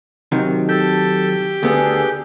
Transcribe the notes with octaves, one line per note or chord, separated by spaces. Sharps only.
C3 D#3 F#3
G4 A4 A5
D2 B3 D4 G#4 A4